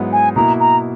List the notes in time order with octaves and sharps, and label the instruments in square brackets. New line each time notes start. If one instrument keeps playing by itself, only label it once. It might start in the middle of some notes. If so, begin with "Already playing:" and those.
Already playing: [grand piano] G#2 F#3 B3 E4
[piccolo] G#5
[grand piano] B2 A#3 E4 [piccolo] A#5
[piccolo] A#5